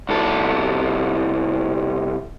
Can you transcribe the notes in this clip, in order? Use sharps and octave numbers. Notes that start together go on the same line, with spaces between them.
C2 A4